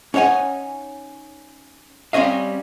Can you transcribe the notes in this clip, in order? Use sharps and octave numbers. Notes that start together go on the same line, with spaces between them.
C#4 D#4 C#5 F#5 G#5
G3 C4 C#4 D#5 F5